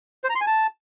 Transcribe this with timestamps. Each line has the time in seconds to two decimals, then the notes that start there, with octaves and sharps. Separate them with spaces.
0.24 C5
0.30 A#5
0.35 C6
0.41 G#5
0.47 A5